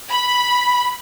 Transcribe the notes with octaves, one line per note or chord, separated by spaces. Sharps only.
B5